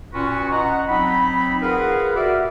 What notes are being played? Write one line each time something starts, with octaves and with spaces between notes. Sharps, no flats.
A#2 C#4 F4 F#4 B4 C#6
D#5 F#5 A#5
F#3 C4 D#4 B5
F4 G#4 A#4 B4 F5 F#5
F#4 G4 A#4 D5 E5